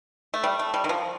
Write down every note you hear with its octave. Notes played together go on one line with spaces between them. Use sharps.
A3
G3
A3
G3
D#3
F3